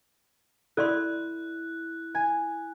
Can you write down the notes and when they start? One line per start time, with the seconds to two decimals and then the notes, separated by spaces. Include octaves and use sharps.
0.77 E4 A4 D5 C6 F#6
2.15 G#5